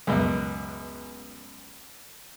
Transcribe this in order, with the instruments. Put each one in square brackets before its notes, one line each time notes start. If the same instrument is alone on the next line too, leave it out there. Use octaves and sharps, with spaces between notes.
[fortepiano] C#2 F#2 B2